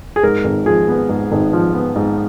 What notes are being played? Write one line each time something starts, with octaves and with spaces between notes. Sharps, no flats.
G#4
G#2 A#4
G#1
F3 G#4
B3
G#2
G#1
F3
B3
G#2